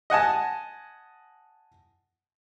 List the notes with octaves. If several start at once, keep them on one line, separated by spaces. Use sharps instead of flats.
D#5 F#5 G#5 A5